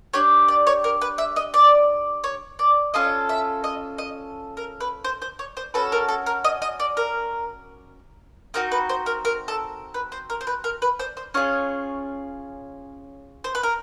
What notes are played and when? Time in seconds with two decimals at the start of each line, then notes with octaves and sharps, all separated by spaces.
0.14 D4 G4 C#5
0.48 D5
0.67 C#5
0.84 A#4
1.01 B4
1.18 E5
1.36 D#5
1.54 D5
2.24 C#5
2.59 D5
2.94 C#4 F4 A4 D#5
3.29 E5
3.64 D#5
3.98 D#5
4.57 A#4
4.80 B4
5.04 C5
5.22 C5
5.39 C#5
5.57 C5
5.74 C#4 F#4 A4 B4
5.92 A#4
6.09 A4
6.26 A#4
6.44 D#5
6.62 D#5
6.80 D5
6.97 A#4
8.54 C4 D#4 F#4 A#4
8.72 B4
8.89 C5
9.06 A#4
9.25 A#4
9.48 A4
9.94 B4
10.12 C5
10.30 A#4
10.41 C5
10.47 B4
10.64 A#4
10.82 B4
10.99 C5
11.17 C5
11.34 C#4 F4 G#4 C#5
13.44 C5
13.55 B4
13.63 A#4